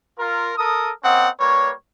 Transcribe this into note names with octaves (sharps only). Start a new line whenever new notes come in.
F4 A#4
A4 A#4 D#6
A#3 C4 C#4 D#5 F#5
G3 A#3 B4 C#5